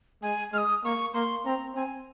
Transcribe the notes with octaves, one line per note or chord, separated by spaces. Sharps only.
G#3 G#5
G#3 F6
D#6
A#3 C#6
A#3 C6
C4 A#5
C4 G#5